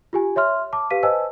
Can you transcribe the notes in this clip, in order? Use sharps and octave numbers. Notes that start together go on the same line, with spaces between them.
F4 G4 G#5
C#5 E5 C6 F6
A5 D6
G4 B4 F5 B6 D#7
B4 C5 D#5 G#5 A5 E6